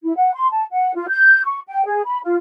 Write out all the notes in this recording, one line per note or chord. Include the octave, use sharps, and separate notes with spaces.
E4
F#5
C6
A5
F#5
F4
G6
C#6
G5
G#4
B5
F4